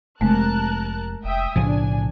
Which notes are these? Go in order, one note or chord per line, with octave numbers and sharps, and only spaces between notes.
F1 C3 G#3 A3 A#4 A5 F#6
F1 E5 G5 D#6
B1 A2 C#3 F3 D4 G#5